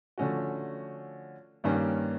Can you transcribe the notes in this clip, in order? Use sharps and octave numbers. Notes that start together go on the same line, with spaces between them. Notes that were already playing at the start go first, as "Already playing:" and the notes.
D3 F3 A3 C#4 F#4
G2 D#3 G3 A#3 C#4